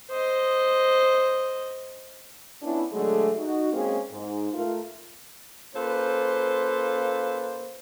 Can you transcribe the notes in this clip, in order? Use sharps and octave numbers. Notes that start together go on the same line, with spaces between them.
C5 D#5
B3 C#4 D4 E4
D3 F#3 G#3 A3
D#4 F#4
G#3 A#3 C4 C#4 G#4
G#2
A3 F4 A#4
A#3 C#4 F4 A4 B4 C5